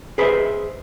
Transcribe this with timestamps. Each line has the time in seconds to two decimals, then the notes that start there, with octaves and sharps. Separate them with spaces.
0.18 G#4 B4 C5 D#5 E5